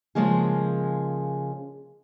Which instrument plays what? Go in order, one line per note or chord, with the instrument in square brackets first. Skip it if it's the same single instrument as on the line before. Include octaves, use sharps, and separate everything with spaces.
[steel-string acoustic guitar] C#3 F3 G#3 A#3 G#4